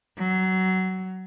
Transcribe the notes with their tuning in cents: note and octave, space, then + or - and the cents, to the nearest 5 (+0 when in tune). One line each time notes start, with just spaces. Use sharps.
F#3 +20